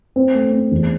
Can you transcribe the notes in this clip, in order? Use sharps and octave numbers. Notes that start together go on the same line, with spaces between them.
C4
A3
C4
E2